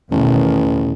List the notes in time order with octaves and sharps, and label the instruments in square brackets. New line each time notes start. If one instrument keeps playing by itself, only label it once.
[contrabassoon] A1 [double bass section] E2 B2 D#3